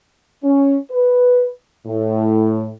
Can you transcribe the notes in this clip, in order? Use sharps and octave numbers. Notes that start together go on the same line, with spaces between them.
C#4
B4
A2